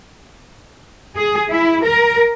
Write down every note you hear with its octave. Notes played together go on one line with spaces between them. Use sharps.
G#4
E4
A#4